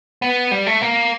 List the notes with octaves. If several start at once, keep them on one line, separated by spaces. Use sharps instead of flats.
B3
G3
A3
A#3